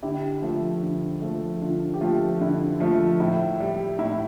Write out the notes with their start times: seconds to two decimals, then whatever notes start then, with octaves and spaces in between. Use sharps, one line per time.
0.03 D3 E4 G4
0.42 F3 A3
0.82 D3
1.22 F3 A3
1.61 D3 F4
1.94 G4
2.01 F3 A3 F4
2.41 D3 E4
2.80 F3 A3 F4
3.20 A2 E4
3.60 G3
3.99 A2 E4